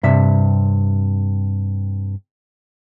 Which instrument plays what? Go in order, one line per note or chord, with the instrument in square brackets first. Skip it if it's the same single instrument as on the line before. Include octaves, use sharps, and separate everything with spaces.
[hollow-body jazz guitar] G2 C3 E5